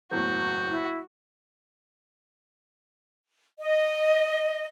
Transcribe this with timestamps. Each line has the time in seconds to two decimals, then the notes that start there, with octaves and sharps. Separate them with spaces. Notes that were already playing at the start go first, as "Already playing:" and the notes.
0.11 F#1 E2 A2 F#4 G6
0.70 E4
3.59 D#5